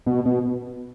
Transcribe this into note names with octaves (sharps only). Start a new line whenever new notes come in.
B2
B2